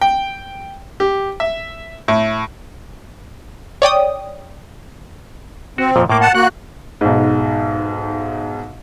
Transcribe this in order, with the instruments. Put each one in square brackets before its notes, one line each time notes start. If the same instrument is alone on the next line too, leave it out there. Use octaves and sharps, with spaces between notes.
[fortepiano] G5
G4
E5
A2
[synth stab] C#5 D5 G5 D#6
[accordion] C4 [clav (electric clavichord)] F#4
[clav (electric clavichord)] F2 A#2 F3
[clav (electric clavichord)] A2 A#3 [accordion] D6
[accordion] F#5 A5
[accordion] A#3 F#4 F#6 [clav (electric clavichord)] F#5
[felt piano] B1 G#2